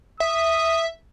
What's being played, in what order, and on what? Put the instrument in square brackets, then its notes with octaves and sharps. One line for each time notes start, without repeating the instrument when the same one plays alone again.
[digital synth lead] E5 [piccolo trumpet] D#6